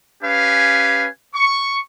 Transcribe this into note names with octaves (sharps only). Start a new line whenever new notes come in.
C#4 G4 B4 F5 G#5
C#6